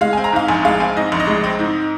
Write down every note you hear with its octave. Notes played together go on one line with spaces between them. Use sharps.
G#3 F5
C4 G#5
A#5
G#2 F5
A#1 G#5
G#3 F5
C4 G#5
G#2 D#5
A#1
D#5
G#3
C4
G#2